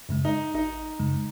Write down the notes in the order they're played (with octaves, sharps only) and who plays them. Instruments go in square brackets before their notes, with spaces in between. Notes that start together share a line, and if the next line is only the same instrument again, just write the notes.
[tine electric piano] F#2 C#3 G#3
[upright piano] D#4
[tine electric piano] G#1 [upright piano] D#4
[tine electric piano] F#2 C#3 G#3